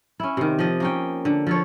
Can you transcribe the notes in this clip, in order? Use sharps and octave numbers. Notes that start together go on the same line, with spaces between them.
C#4 E4
C3 D#3
F3 D#5
A#3 C#4 G5
D3
F3 A4 C#5